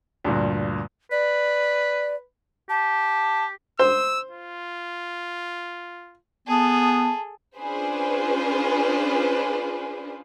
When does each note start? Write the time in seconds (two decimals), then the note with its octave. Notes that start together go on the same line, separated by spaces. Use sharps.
0.24 D2 G2 A#2
1.11 B4 D5
2.69 G4 A5
3.79 C5 E6
4.31 F4
6.48 B3 G#4 A4 A5
7.58 C#4 D4 F4 G#4 B4 C5